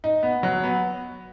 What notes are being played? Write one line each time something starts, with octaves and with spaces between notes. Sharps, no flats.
D#4
B3
F#3
B3